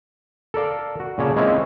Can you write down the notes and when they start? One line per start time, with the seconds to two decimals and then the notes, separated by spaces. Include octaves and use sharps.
0.54 A4 A#4 D5 F5
1.00 F#4
1.18 A#2 C#3 C#5 D5 A5
1.36 G#3 A#3 C4 C#4 E4 F4